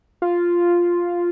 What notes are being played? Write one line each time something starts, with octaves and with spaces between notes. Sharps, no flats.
F4